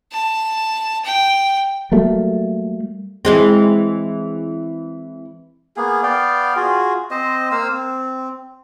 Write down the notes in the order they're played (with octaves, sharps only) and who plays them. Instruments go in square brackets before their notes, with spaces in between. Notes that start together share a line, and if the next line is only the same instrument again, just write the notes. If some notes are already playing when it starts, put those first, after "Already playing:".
[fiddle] A5
G5
[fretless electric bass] F#3 G3 A3 A#3
[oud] E3 G#3 C4
[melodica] A#3 B3 G#4
B3 D5 F5 G5
F4 F#4 G#4
C4 C5 D#5
A#3 C5 F5 E6
C4